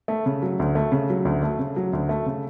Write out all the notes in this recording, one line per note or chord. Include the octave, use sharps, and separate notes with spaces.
A3
C#3
F#3
D2
A3
C#3
F#3
D2
A3
C#3
F#3
D2
A3
C#3